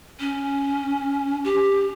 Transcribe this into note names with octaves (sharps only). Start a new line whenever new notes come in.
C#4
G4